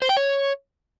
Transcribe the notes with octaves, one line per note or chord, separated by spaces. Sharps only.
C5
G5
C#5